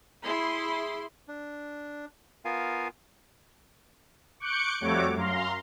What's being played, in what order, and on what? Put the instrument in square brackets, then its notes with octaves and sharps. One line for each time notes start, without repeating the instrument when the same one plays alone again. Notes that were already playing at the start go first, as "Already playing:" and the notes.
[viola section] E4 G#4 C6
[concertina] D4
B3 F4 A#4 F5 G#5
[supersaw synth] C#6 D6 F#6 G6 C#7 D7
F2 G3 A3 F#4 C#5 D6
F#2 F5 A#5 C6